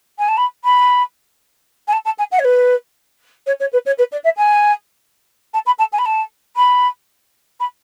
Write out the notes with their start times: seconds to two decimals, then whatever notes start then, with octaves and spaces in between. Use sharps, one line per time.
0.18 G#5
0.28 A5
0.37 B5
0.63 B5
1.87 G#5
1.92 A5
2.05 A5
2.18 G#5
2.31 F#5
2.39 C#5
2.44 B4
3.46 C#5
3.60 C#5
3.72 B4
3.85 C#5
3.98 B4
4.11 D5
4.24 E5
4.36 G#5
5.53 A5
5.66 B5
5.78 A5
5.92 G#5
5.98 B5
6.05 A5
6.56 B5
7.59 B5